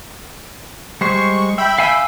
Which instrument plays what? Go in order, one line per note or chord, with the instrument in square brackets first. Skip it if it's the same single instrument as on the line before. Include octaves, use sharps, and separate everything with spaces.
[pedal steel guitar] G3 G#3 C5 [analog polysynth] C#6
[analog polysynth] E5 G5 B5
[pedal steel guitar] F5 G#5 E6